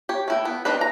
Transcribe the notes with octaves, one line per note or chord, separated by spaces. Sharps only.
G4 C#5
A3 E4 G5
B3
C4 D4 D#4 B4
E3 A#5